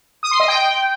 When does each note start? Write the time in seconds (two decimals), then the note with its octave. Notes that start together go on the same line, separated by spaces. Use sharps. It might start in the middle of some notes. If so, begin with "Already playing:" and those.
0.23 D#6
0.31 C6
0.40 D#5
0.48 G5